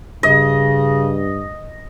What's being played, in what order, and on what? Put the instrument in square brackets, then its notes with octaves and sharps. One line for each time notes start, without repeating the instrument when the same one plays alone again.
[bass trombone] G2 [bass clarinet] C#3 [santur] D#5